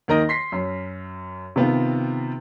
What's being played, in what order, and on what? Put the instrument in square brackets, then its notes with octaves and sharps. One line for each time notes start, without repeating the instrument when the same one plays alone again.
[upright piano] D#2 D#3 A#4 D#5 A#6
C6 B6 C7
F#2
C3 D#3 B3 C4 F4